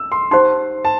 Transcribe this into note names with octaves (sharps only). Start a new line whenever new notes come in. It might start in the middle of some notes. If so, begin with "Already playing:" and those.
Already playing: E6
C6
D#4 G4 C5 F#5 C6
A5